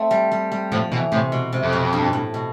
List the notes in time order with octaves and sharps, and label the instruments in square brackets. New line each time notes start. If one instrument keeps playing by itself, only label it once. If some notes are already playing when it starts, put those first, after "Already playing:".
Already playing: [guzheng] A3 C4
G3
G3
G3
[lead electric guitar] A2 [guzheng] F3
[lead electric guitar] B2 [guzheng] E3
[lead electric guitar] A2 [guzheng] C3
[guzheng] B2
C3
[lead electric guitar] F2
[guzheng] B2
G2
A2
B2